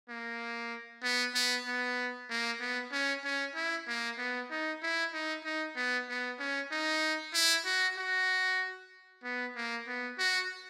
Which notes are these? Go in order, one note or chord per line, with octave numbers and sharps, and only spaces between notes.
A#3
B3
B3
B3
A#3
B3
C#4
C#4
E4
A#3
B3
D#4
E4
D#4
D#4
B3
B3
C#4
D#4
E4
F#4
F#4
B3
A#3
B3
F#4